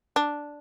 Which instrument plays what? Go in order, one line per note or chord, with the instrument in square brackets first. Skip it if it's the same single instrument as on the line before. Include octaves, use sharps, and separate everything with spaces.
[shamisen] D4